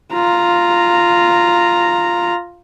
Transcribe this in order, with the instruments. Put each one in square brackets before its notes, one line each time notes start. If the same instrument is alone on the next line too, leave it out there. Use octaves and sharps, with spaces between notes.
[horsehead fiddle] F4 A#5